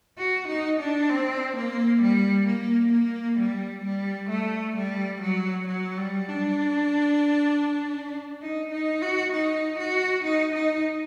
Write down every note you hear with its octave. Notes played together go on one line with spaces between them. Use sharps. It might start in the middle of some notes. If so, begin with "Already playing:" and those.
F#4
D#4
D4
C4
A#3
G3
A#3
A#3
G3
G3
A3
G3
F#3
F#3
G3
D4
D#4
D#4
F#4
D#4
F#4
D#4
D#4